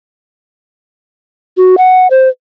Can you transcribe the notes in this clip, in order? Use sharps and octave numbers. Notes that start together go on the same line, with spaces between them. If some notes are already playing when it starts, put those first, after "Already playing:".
F#4
F#5
C5